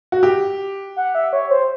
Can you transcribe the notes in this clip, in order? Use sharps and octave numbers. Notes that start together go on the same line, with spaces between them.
F#4
G4
F#5
E5
C#5
C5